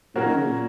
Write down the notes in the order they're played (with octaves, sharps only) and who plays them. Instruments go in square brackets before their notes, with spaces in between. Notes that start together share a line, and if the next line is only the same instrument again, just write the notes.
[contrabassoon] A#2 [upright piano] F#3 A#3 C#4 F#4 A#4
[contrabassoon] D#3
C#3
A#2